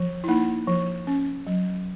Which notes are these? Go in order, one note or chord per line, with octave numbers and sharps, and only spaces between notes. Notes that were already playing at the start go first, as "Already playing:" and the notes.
Already playing: F3
E4
A#3 D#4
F3
C#4
F#3